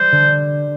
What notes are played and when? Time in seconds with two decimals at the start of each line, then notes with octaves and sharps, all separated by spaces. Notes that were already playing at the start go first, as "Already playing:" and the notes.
Already playing: G3 C5
0.12 D3